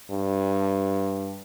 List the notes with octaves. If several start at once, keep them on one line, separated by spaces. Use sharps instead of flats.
G2